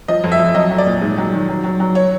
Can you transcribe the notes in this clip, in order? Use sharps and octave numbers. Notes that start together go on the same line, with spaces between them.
F3 D#5
F2
E5
F2
F#3 D#5
F#3
D5
A#2
G#2
F#3
D#3
F#3
F#3
F#3
C#5